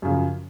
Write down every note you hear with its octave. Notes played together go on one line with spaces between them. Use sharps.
F#2 C#3 F3